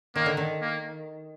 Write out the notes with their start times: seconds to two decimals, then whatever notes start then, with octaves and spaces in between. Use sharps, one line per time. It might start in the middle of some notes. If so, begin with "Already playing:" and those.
0.15 D#3 A#3
0.26 D3
0.37 D#3
0.62 A#3